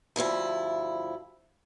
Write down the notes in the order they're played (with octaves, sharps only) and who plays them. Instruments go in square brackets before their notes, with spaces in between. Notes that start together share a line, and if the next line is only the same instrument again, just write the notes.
[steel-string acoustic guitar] D2 G2 F3 E4